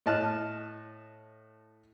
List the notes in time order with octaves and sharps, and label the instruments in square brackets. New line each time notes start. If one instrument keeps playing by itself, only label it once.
[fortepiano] A2 D#5 A5 F6 F#6